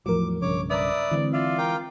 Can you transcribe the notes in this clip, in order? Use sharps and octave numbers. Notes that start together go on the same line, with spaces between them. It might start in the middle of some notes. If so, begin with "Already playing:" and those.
E2 A2 F3 F#3 A#4 D6
B1 G2 C#3 C#5 D6
B4 D5 E5 A#5 D6 D#6
D3 E3 G#3 C4
F4 D5 E5
A#4 G5 D6